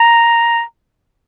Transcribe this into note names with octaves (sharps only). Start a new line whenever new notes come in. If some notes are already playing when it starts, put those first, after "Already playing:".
Already playing: A#5